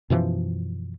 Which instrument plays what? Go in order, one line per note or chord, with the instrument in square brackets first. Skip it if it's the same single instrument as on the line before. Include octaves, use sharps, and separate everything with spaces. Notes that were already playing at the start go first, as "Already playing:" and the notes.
[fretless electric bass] F#2 B2 E3 F3